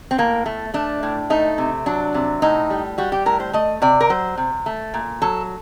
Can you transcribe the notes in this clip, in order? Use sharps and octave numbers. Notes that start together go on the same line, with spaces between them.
C4
A2 A#3
A3
A3 D4
A2
A3 D#4
C3
F#3 D4
C3
A2 D#4
G3
G3 F#4
G4
A2 A#4
C5
A3 D#5
C3 D5
A#4
F#3 C5
C3
A3
A#2
F#3 A4